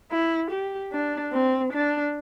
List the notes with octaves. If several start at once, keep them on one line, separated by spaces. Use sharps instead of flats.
E4
G4
D4
C4
D4